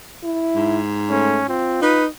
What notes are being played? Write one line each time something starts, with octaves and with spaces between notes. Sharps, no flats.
E4
G#2
A3 C#4
C4 F4
D#4 B4